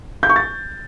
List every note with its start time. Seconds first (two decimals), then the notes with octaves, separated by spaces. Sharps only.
0.23 G6
0.29 C#6
0.36 A6